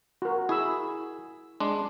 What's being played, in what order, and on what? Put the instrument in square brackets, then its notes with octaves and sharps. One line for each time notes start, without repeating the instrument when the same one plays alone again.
[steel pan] F#4 A#4
[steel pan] E4 B5 E6 [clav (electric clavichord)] G#4
[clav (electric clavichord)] G#3 D4 [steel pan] C6 D6